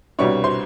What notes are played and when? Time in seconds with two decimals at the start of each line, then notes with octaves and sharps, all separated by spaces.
0.19 C2 B2 G3 B3 D4 C#5 C#6
0.44 C5 C6